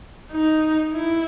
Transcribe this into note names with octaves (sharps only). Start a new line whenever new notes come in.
D#4
E4